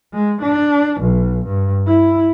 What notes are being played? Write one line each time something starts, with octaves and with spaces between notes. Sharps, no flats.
G#3
D4
B1
G2
E4